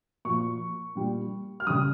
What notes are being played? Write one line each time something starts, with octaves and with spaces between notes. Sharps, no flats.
A#2 F3 C#6
A#2 G3
F6
C#3 G3 D#6